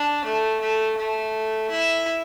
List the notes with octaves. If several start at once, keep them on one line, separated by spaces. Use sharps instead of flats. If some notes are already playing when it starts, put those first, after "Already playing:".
Already playing: D4
A3
A3
A3
E4